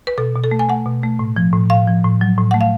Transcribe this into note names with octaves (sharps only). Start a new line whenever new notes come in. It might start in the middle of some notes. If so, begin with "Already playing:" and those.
B4
B2 A4
B2
A4
A3
G#5
A3 F#5
B2
A3
A2
F3
A2
A2 F5
F3
A2
F#3
A2
A3 F#5
F5